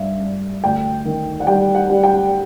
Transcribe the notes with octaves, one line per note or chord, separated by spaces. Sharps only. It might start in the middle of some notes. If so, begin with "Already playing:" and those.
Already playing: G2 E5 F5
G2
D2 G5
D#3
F#5
G3 G5
F#5
G3
G5